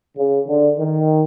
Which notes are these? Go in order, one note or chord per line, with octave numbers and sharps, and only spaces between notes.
C#3
D3
D#3